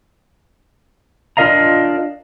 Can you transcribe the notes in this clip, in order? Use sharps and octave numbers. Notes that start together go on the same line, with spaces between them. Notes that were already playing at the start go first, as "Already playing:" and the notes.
D4 F4 A#4 D#5 F5 A#5